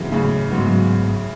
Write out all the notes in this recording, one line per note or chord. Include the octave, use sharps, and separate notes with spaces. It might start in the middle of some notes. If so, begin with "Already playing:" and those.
Already playing: G#2 C#3 E3 F#3 B3 D#4
A2 C#3
G#2 F#3 B3 D#4